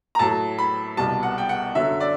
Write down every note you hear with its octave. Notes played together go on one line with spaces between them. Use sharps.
A#5
A2 F#3 A5
B5
C2 B2 G3 A5
F#5
G5
F#5
F#2 D3 F#3 E5
D5